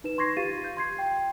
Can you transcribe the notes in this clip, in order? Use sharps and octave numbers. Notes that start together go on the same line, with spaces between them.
D#4 B4 E7
C6 C#6 G#6 A#6 C7
F4 G4 F5 A6 D#7
G6
C6 G#6 C7
G5